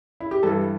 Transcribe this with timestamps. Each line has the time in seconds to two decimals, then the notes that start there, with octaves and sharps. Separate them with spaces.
0.20 E4
0.31 G4
0.43 G2 E3 G3 A4